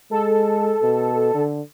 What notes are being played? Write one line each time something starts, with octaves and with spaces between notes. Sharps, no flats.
G#3 A4
B2
D3